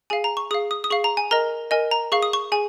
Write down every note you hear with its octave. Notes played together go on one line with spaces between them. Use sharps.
G#4 F5 G#5
A#5
C#6
G#4 F5 D#6
D#6
D#6
G#4 F5 C#6
A#5
G#5
A#4 D#5 A#5
A#4 D#5 G#5
A#5
G#4 F5 C#6
D#6
C#6
G#4 G#5